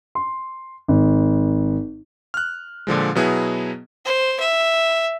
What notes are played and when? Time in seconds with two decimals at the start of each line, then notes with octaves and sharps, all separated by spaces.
0.15 C6
0.88 G#1
2.34 F6 F#6
2.87 A#2 D3 F3 G#3
3.15 B2 F#3 B3 E4 G#4
4.05 C5
4.39 E5